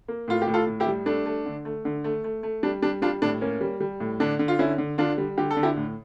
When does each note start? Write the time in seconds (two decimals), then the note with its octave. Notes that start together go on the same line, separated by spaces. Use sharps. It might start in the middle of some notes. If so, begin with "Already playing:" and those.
0.08 A#3
0.28 A2 F4
0.42 G4
0.47 A2
0.54 F4 A4
0.67 A2
0.80 E4 G4
0.86 G3
1.06 A3 D4
1.26 A3
1.46 D3
1.65 A3
1.85 D3
2.04 A3
2.24 A3
2.43 A3
2.63 G3 D4
2.82 G3 D4
3.02 G3 D4 F4
3.22 A2 D4
3.41 A#3 C#4
3.61 G3
3.80 G3
4.00 A2
4.20 D3 D4
4.39 D3
4.48 F4
4.59 D3 C#4 E4
4.78 D3
4.98 D3 D4 F4
5.18 G3
5.38 D3 G4
5.51 A4
5.57 D3
5.63 E4 G4
5.77 A2